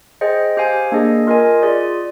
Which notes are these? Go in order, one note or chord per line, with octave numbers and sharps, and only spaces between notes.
G#4 C5 D#5 G5
G4 C5 F5 G#5
A#3 D4 G#4 D#5
F4 A#4 D#5 G#5
F4 G#4 D5